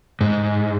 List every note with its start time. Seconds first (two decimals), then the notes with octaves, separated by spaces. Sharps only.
0.21 G#2